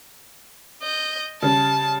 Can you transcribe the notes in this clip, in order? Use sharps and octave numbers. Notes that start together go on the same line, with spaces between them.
D#5 G6
C#3 G3 A5